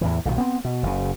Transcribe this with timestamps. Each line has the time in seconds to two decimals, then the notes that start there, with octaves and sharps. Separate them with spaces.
0.01 E2 A2 E3
0.25 B1 A#2 D#3
0.38 B3 C4
0.65 B2
0.83 F#1 C#3